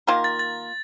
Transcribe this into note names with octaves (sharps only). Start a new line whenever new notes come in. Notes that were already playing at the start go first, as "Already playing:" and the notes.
D#3 A#3 F4 A#4
A6
A6